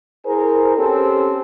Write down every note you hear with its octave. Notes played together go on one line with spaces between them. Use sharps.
E4 G#4 A#4 C5
C4 C#4 G4 A4